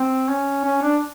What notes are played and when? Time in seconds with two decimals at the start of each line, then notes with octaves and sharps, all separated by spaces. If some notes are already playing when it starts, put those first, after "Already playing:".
Already playing: C4
0.29 C#4
0.64 C#4
0.82 D4